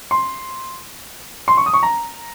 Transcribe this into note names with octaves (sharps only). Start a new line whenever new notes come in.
C6
C6
C#6
D#6
C#6
A#5